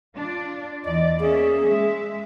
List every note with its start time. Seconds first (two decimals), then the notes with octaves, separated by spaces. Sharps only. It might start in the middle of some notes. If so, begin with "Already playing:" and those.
0.15 D4 F4 D5
0.85 E2 E3 D5 D#5
1.20 A#3 C#4 G#4 E5
1.66 G#3 E5